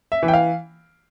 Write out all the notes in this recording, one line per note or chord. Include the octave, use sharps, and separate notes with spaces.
E5
E3
G5
F5